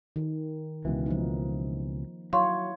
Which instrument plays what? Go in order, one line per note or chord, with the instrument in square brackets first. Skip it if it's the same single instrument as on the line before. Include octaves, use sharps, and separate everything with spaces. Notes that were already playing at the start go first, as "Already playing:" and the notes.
[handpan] D#3
[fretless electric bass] C#2 B2 E3
[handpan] F3 A#3 D#4
[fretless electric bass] F#3 [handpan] E4 C#5 [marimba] F5 C6 C#6